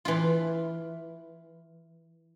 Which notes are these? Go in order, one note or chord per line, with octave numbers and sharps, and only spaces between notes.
E3 F4